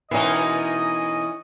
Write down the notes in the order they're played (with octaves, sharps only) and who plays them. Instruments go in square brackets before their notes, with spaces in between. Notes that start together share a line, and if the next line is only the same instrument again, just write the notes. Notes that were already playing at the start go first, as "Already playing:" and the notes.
[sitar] B2 D#4 A#4 [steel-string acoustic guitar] E3 C#4 [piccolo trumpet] D#5